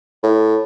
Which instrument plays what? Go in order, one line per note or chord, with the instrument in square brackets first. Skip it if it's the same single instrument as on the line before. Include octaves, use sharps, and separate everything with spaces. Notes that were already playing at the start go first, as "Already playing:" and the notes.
[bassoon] A2